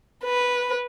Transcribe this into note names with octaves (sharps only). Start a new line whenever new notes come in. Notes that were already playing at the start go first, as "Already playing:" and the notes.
B4